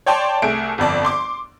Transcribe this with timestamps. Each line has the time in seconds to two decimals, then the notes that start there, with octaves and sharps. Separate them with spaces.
0.06 C#5 D5 G5 A5 C6
0.42 C2 A3 G#4 D7
0.78 G1 F2 D5 A5
1.05 C6 D6